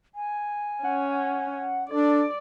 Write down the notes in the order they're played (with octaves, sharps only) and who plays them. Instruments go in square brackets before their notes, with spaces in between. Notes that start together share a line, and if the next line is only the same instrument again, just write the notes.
[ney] G#5
[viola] C#4 [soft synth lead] F#5
[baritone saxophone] D4 [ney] A4 [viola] D5